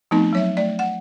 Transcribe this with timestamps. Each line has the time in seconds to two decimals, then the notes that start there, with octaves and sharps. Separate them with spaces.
0.11 F3 A3 B3 C4 D#4
0.33 F#3 C#5 E5
0.57 A3 D5
0.79 F#5